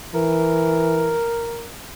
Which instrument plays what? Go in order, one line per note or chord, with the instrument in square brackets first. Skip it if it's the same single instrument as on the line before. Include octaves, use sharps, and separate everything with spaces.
[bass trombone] E3 [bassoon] A#4